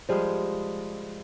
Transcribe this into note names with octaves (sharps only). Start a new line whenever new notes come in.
F3 G3 G#3 G#4